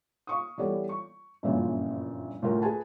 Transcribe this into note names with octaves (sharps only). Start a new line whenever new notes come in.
F5 C#6 D#6
E3 G3 B3 A4 C#5 D5
C#6
G1 F#2 A#2 C#3 E3 F3
D2 A2 F4 A#4
G#4 B4 G#5 A5